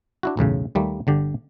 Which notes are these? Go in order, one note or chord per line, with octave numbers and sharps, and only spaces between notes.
D4 E4 F#4
B1 E2 A2 C#3
D#2 G3 A3 A#3
G1 D3 G4